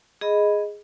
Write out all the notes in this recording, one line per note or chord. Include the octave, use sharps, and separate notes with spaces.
G#4 D#5 B5